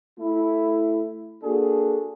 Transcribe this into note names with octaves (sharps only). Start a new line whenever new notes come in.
A3 E4
A#3 D4 F#4 G#4 A4